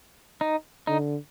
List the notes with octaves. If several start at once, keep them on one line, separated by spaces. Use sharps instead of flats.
D#4
D3 D#4